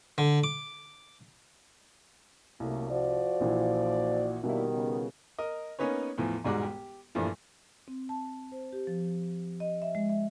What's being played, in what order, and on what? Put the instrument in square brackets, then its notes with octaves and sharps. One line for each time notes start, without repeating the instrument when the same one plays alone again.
[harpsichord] D3
D6
[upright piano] C2 [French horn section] F#2 A3 A#3
[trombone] F3 [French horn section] F#4 D5
[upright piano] A#1 A#2 E3
[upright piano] B2 G3 [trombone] D#3 [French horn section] A#3 D4 E4
[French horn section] C#3 B3
[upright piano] A#4 D#5
A#3 B3 C#4 D#4 B4 C#5
E2 A2 E3 F3
E1 G#2 G3 G#3 F#4 D6
G4
G2 A#2 E3 F3 A3
[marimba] C4
A5
C5
G4
F3
D#5
E5
G#3
E5